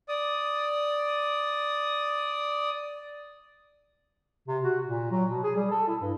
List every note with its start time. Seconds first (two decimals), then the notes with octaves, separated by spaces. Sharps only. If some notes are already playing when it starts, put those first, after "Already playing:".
0.08 D5 D#6
4.48 C3
4.63 F#4
4.87 A#2
5.11 F#3
5.30 B2
5.43 G#4
5.55 G3
5.71 A4
5.88 E4
6.02 G2